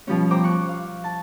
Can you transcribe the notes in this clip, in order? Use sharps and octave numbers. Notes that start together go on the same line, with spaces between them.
B2 F3 G3 C#4
C5 G5 A#5 D6
C#6 F#6
F5
A5